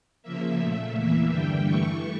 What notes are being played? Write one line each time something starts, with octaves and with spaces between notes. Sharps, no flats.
C#3 F3 A#3 E5
A#2 A3
E2 E3 A#3
G2 D3 G3 G5
G2 E3 A3 C#6